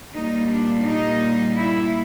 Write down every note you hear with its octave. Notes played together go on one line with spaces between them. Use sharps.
A#2 G3 A#3 D#4
D4
D#4
E4